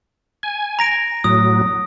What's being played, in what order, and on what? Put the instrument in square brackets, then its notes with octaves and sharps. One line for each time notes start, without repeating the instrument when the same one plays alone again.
[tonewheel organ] G#5
[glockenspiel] A#5 A#6 D7
[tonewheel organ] A2 F#3 [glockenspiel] D#6